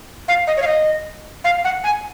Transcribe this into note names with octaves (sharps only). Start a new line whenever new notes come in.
F5
D#5
C#5
F5
D#5
F5
F#5
G#5